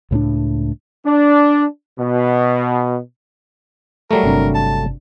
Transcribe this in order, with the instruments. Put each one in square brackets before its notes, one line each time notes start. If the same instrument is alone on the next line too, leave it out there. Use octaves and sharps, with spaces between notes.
[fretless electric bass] C#2 A2 G3 D4
[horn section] D4
B2
[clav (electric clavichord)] F#3 G3 A3 [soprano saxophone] A#4
[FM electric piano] G1 C3 D4
[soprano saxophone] A5